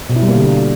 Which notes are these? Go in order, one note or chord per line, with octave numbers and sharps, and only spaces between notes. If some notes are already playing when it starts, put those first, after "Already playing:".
B2
E4
G3
A#3
D3